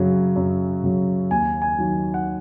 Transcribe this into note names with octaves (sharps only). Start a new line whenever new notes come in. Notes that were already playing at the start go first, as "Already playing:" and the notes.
Already playing: F#2 C#3 F#3
F#2
C#3 F#3
D#2 G#5
G#5
D#3 F#3
F#5